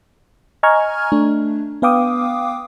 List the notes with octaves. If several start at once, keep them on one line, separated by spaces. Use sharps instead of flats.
D#5 G#5 A#5 C#6 F6 G#6
A3 D4
B3 B4 F5 G5 D6 D#6